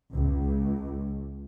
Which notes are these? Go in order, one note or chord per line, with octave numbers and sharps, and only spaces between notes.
C#2